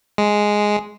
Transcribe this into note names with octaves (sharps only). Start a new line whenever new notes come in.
G#3